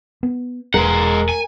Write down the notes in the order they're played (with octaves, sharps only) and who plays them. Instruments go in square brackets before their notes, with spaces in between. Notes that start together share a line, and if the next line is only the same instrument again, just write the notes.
[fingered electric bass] B3
[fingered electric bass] E1 [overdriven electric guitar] G#3 F#5 [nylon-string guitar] A#4
[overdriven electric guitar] G#5